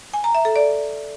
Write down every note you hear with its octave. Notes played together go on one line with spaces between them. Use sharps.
G#5
A#5
E5
A4
D5